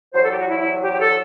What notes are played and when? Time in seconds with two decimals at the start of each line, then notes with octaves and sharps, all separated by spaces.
0.13 E2 C3 F#3 C5
0.22 A4
0.31 G4
0.39 F#4
0.48 E4
0.59 E4
0.82 G4
0.93 G4
0.99 A4